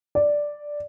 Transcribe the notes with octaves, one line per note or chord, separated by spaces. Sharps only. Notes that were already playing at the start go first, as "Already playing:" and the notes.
D5